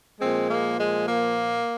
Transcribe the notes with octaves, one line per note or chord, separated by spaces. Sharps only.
A#2 F3 G#3 C4
A#3
G#3
A#3